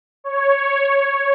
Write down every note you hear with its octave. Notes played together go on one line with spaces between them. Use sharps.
C#5